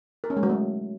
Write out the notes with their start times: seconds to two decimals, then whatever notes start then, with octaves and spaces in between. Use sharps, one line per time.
0.24 A#4
0.30 C#4
0.37 G#3
0.43 F#3
0.49 A3